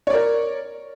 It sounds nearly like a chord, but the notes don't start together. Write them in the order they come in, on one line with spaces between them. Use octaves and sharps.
C#5 D5 A#4